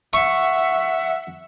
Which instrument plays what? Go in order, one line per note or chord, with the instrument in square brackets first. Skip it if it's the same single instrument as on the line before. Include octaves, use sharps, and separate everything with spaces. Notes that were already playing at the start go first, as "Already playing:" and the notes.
[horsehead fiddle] E5 F#5 [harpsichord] C#6